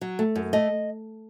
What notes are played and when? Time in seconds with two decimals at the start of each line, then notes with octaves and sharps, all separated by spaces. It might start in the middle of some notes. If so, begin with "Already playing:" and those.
0.01 F#3
0.19 A3
0.35 F#2
0.53 A3 D#5